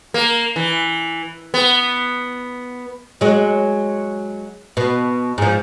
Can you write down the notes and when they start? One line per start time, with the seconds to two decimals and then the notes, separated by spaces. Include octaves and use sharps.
0.14 A#3
0.56 E3
1.54 B3
3.21 F#3 G#3
4.77 B2
5.38 G#2 F3